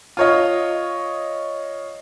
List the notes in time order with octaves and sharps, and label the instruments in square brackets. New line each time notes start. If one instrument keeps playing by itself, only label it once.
[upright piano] F4 C#5 D#5